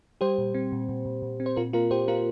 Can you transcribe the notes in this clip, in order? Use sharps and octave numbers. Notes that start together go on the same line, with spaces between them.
G3 G4 C5
A#2
C4
A#2
A#2
A#2
A#2
C4
C5
A#2 F4 A#4
A#3 F4 A#4
A#2 G4 C5
A#3 F4 A#4